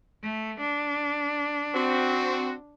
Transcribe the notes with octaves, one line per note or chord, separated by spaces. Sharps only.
A3
D4
C4 F#4